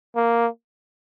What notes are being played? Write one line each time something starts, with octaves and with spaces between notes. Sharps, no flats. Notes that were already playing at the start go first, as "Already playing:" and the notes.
A#3